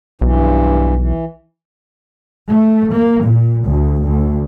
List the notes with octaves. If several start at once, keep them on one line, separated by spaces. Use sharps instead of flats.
B1 G2 E3
E3
A3
A#3
A#2
D2
D2